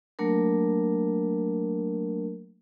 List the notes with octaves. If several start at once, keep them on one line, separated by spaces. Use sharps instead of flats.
F#3 A3 A#3 D4 A#4